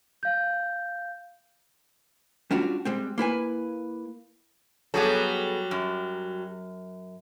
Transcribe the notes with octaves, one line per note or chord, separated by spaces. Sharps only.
F5 G6
G3 C#4 D4 F4 F#4
G3 G#3 C4
A#3 E4 B4 G#5
F#3 G3 B3 G#4 A4
F#2